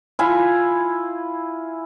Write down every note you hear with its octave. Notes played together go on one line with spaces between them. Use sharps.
E4 F4 G#5